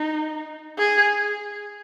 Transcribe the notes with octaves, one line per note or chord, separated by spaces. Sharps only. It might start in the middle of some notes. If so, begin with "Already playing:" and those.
Already playing: D#4
G#4